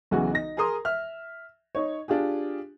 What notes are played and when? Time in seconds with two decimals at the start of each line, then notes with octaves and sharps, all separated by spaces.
0.11 B1 C#3 E3 F#4
0.32 D#4 A#6
0.57 G#4 A#4 A#5 C6 D#6
0.85 E5 F6
1.75 D#4 C#5
2.08 D4 F4 G4 G#4